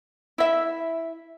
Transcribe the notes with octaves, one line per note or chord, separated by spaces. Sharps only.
E4 E5